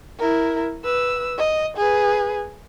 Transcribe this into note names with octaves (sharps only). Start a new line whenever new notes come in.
E4 A#4
B4 E6
D#5
G#4 B4